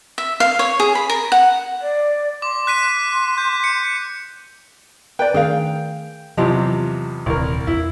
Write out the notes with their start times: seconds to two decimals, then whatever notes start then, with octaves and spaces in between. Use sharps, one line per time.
0.18 E5
0.40 F5
0.59 C#5
0.80 G#4
0.95 B5
1.10 A#4
1.32 F#5
1.82 D5
2.42 C6 D6
2.67 F#6 B6 D#7
3.38 G6
3.64 C#7
5.19 B4 D5 G5
5.34 D#3 A3 D4 G#4 A#4 F5
6.37 E2 C3 F3 F#3 F4 G4 D#5
7.26 D#1 C2 A#4
7.67 E2 E4